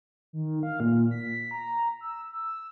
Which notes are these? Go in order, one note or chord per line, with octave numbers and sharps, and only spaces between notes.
D#3
F5
A#2
B6
A#5
E6
E6